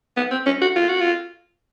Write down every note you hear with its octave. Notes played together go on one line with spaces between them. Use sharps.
B3
C4
C#4
F#4
F4
F#4
F4